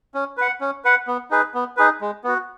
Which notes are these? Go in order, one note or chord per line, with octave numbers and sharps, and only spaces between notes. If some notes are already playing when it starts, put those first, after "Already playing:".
C#4
B4 F#5
C#4
B4 F#5
B3
D#4 G#4 B4
B3
D#4 G#4 B4
G#3
B3 F#4